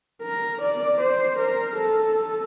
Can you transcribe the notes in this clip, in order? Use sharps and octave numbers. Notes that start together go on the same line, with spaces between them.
A#4
D5
C5
A#4
A4